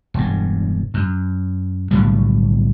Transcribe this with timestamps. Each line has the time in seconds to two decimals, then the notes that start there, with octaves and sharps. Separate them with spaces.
0.14 E1 G2
0.94 F#2
1.91 B1 A2 D3 G3